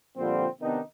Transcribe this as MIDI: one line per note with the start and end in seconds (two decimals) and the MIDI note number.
0.17 0.47 46
0.17 0.47 50
0.17 0.47 53
0.17 0.47 55
0.17 0.47 60
0.62 0.80 48
0.62 0.80 51
0.62 0.80 59
0.62 0.80 62
0.62 0.80 63